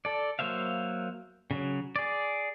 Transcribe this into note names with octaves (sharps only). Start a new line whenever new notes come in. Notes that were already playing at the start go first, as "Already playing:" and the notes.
A4 D5
F#3 A#3 C5 E5 F5
C#3 F#3
G#4 D5